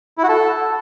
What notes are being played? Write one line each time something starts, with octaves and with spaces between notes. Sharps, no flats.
E4
F#4
A4